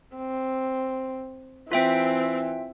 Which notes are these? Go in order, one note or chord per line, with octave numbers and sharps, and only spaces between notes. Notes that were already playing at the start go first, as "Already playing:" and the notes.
C4
E3 C4 F4 E5 G5